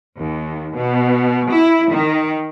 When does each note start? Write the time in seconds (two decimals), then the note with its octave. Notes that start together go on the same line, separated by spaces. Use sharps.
0.18 D#2
0.75 B2
1.51 E4
1.91 D#3